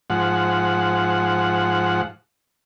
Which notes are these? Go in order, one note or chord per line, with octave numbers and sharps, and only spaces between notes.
G#2 F3 F#5